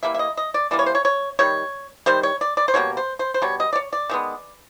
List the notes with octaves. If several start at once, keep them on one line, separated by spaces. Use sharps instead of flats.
E3 G3 A#3 E5
E5
D#5
D#5
D5
E3 G3 A#3 D5
C#5
C5
C#5
C#5
D#3 G3 C#5
D#3 G3 C5
C#5
D5
D5
C5
B2 G3 A#3 C#5
C5
C5
C5
B2 G3 C#5
D#5
D5
C#5
D5
D#3 G#3 B3